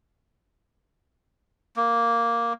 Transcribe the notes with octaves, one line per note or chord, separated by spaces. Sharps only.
A#3